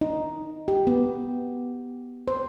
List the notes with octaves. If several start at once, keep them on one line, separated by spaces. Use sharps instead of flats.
D#4
G4
B3
C5